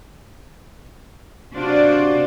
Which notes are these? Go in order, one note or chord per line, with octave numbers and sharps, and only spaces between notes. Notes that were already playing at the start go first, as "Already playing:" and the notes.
C3 D4 F4 F#4 C5 D5